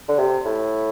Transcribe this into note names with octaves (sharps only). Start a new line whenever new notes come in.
D3
C3
A2